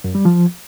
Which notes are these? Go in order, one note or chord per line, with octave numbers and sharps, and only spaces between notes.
F#2
G3
F3